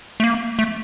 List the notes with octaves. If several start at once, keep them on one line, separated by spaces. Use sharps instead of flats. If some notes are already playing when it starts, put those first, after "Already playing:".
A3
A#3
A3